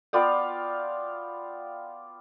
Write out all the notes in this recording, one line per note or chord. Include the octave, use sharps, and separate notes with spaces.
B3 F4 D5 G5